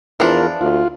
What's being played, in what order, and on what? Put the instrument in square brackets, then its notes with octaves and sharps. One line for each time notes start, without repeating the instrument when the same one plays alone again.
[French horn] E2 [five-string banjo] E3 F3 D4 [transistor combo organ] F4 A#4
[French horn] D2 [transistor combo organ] F4